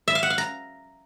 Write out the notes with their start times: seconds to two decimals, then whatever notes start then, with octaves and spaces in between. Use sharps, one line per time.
0.08 E5
0.15 F5
0.23 F#5
0.30 F5
0.38 A#5